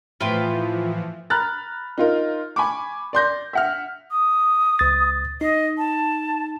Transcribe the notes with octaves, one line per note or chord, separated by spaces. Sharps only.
A2 E3 F3 F4 B4 G5
A#5 B5 F6 F#6 A6
D#4 F4 A#4
G#5 B5 C#6 D6
D5 C6 G6 A#6
E5 F#5 F6
D#6
C#2 A6
D#4 D#5
A5